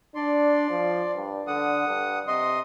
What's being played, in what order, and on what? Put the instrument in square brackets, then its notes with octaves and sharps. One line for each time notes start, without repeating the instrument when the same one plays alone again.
[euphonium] D4 [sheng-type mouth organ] D5 C6
[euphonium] F3
G2
[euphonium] D3 [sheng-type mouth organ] F#5 D#6
[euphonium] G2
[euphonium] C3 [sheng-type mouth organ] D#5 C6 D#6